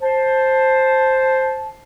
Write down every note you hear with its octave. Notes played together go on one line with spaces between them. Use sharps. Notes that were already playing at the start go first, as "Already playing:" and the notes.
C5 A5